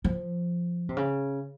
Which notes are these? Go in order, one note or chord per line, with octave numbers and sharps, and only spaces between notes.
F3
C3
C#3